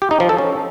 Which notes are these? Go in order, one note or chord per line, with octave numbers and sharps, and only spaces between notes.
G4
D#4
F3
A4
C#4